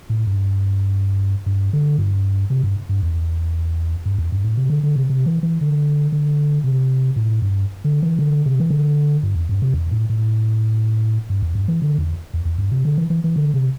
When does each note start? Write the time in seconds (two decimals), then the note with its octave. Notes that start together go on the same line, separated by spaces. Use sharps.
0.10 A2
0.27 G2
1.46 G2
1.73 D3
1.98 G2
2.50 C3
2.63 G2
2.89 G2
3.03 E2
4.06 G2
4.18 E2
4.32 G2
4.44 A2
4.57 C3
4.70 D3
4.83 D3
4.95 C3
5.10 C3
5.26 E3
5.43 E3
5.61 D3
6.12 D3
6.64 C3
7.16 A2
7.42 G2
7.85 D3
8.03 E3
8.19 D3
8.46 C3
8.60 E3
8.70 D3
9.23 G2
9.35 E2
9.49 G2
9.62 C3
9.74 E2
9.91 A2
10.10 A2
11.30 G2
11.42 E2
11.55 G2
11.68 E3
11.82 D3
11.98 E2
12.34 E2
12.45 E2
12.58 G2
12.72 C3
12.85 D3
12.98 E3
13.10 E3
13.24 E3
13.36 D3
13.54 C3